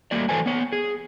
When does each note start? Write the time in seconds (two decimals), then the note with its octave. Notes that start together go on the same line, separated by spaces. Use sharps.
0.11 G3 A3 A#3 F#4 D5
0.29 E3 F#3 A4 B4 C5 G#5
0.46 B3 C#5
0.72 G#4